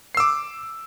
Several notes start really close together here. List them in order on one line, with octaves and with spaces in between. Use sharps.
C7 E6 D6